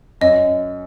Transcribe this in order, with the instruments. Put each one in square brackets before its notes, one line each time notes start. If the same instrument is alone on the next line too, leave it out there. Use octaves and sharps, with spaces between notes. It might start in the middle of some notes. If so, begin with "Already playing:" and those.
[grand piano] F#2 [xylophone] D#5